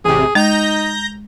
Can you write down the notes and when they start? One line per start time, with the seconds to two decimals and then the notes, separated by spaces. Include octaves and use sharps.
0.05 A1 C3 G#4
0.35 G#3 D#4 A#5 G6 A#6